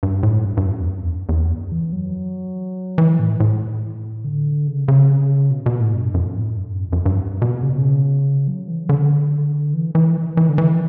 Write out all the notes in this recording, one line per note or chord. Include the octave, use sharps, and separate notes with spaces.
G2
A2
G2
G2
F#2
E2
F#2
E2
F#2
E2
F#2
E3
F#3
E3
A2
A2
D3
C#3
C#3
B2
B2
A2
G2
F#2
A2
G2
F#2
F#2
G2
B2
C#3
B2
C#3
F#3
E3
D3
E3
E3
E3
D3
E3